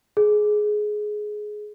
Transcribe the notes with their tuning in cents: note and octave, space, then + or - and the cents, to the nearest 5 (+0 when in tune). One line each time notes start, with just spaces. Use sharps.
G#4 +15